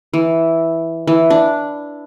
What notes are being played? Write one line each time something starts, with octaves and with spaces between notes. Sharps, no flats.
E3
E3
D4